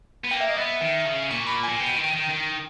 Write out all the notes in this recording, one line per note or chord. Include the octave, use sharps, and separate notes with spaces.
B3
A#3 G5
E5
D#5
B3 E5
D#3
C#3
A#2 C#6
B5
G#5
A#2
B2 G5
D#3
D#3
D#3